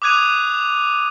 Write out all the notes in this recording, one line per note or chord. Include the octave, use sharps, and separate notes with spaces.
D6 D#6 F#6 G#6 D#7 F7